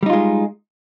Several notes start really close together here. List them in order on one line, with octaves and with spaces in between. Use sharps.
G3 D#4 F4 G#3